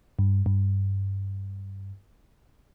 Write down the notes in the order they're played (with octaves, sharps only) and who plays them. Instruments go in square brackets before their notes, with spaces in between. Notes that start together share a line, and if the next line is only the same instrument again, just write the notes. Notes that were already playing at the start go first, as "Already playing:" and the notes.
[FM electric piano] G2
G2